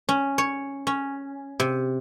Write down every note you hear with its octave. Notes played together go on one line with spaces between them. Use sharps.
C#4
C#5
C#4
C3